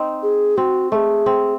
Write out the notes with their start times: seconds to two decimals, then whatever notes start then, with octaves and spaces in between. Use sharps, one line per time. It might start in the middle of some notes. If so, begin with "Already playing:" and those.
Already playing: C4 D#4
0.23 G#4
0.57 C4 F#4
0.91 A3 G#4 A4
1.26 C4